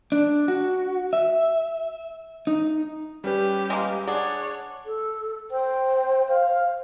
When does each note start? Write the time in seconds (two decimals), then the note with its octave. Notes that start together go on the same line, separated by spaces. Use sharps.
0.12 D4
0.48 F#4
1.13 E5
2.47 D#4
3.24 G3 C#4 G4 B4
3.70 G#3 A#3
4.07 D4 G#4 C#5 F#5
4.85 A4
5.51 C5 G5
6.28 F5